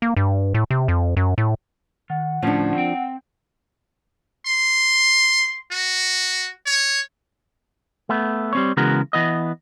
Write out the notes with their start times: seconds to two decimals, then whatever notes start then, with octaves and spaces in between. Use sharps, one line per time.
0.02 A#3
0.16 G2
0.54 A2
0.71 C3
0.88 F2
1.17 F#2
1.38 A2
2.10 D#3 F#5
2.43 D2 A2 F3 C#4 D4
2.75 C4 G5
4.46 C6
5.71 F#4
6.66 C#5
8.09 A3 B3
8.53 G3 C4 C#5
8.77 C#3 E3 G#3 B3 F#4 A#4
9.13 E3 B3 D#5